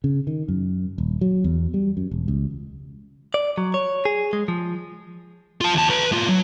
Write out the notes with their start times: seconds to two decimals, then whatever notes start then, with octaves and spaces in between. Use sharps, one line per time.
0.04 C#3
0.27 D#3
0.48 F#2
0.98 D#1
1.21 F#3
1.44 E2
1.74 G3
1.97 F#2
2.11 E1
2.28 C#2
3.34 D5
3.58 F#3
3.74 C#5
4.05 G#4
4.33 G#3
4.48 F3
5.61 F4 A5
5.74 D#2 A5
5.90 B4 A#5
6.12 A2 F4
6.29 F#3